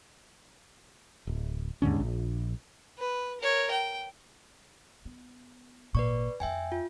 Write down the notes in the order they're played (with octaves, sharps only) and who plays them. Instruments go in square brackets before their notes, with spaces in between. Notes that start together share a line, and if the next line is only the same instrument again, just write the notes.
[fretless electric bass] D1
D#2 G#2 D3 C#4
A#1
[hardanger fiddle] B4
A#4 C#5
G5
[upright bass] B3
[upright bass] G#1 A#2 [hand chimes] B4 D5 C#6
[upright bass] F2 A3 [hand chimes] E5 G5 G#5
[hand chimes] F4